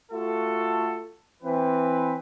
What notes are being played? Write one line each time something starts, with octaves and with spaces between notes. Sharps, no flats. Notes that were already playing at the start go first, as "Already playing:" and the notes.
A3 F4 F#4 A4
E3 C4 B4